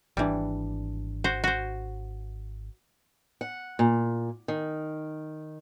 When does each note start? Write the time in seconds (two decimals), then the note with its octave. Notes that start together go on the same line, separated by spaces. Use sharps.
0.17 G#1 E3 G3 D4
1.24 F#4 C5
1.44 F#4 C5
3.41 F#5
3.79 A#2
4.48 D#3